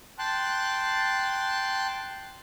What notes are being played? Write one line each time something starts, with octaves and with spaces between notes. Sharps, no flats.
G5 A5 C6 F#6